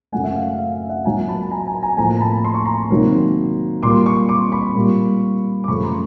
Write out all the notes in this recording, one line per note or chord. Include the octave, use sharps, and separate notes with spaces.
F#2 C#3 F#3 A3 F#5 G#5
E5 F#5
F5
F5
F5
E5 F#5
A#2 F#3 A#3 G#5 A#5
A5 B5
G#5 A#5
G#5 A#5
G#5 A#5
A2 F3 A#3 G#5 A#5
A#5
A5 B5
C6
C#6
A#5 C6
C3 D#3 F#3 A#3
A#2 G3 A#3 C6 D6
B5 C#6
C6 D6
B5 C#6
A#2 G3 A#3
D6
F#2 C#3 F3 A3 B5 C#6
A#5 C6